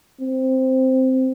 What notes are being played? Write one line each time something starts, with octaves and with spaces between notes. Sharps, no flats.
C4